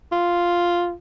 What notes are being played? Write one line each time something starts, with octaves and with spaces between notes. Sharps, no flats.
F4